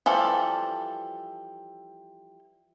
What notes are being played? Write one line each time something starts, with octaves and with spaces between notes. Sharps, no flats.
E3 F3 G3 A4